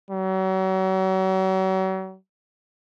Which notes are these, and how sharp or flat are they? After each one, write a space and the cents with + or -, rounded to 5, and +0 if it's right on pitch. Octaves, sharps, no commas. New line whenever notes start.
F#3 +40